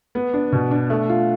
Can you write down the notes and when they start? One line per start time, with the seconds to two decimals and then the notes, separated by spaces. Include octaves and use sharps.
0.15 B3
0.33 D4
0.52 B2
0.71 D4
0.90 A3
1.09 F4